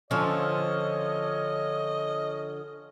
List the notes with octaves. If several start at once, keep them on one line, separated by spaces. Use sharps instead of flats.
D3 F3 C#4 F4 A4 C#5 D#5